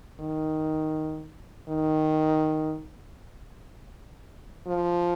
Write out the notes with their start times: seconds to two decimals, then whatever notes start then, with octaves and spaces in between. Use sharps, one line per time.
0.20 D#3
1.69 D#3
4.67 F3